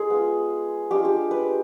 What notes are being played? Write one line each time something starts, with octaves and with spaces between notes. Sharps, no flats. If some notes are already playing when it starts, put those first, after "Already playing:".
Already playing: G#3 G#4
B3 F4
G#3 D4 F4 G4
G4
B4